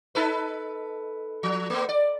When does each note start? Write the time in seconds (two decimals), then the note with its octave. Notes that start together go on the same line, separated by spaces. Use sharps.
0.15 D#4 A4 B4
1.43 F3
1.70 A3 B3
1.89 D5